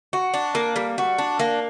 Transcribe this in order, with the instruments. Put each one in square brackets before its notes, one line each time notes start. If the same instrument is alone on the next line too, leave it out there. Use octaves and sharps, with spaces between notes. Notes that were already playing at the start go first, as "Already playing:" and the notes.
[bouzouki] F#4
D4
A#3
G3
F#4
D4
A#3